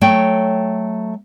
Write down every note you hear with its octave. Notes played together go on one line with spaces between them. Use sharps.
F#3 A3 C#5 G5